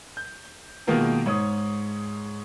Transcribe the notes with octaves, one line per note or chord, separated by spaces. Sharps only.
G6
B2 D#3 G#3 A#3 F4 A#4
G#2 C#5 D#6